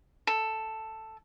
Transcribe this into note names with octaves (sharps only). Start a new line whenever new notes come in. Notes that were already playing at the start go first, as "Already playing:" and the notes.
A4